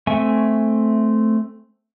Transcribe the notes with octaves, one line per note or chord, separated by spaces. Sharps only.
A3 C4 E5 G#5 C#6